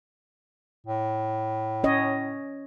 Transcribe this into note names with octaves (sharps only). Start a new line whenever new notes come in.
A2
C#4 C#5 D#5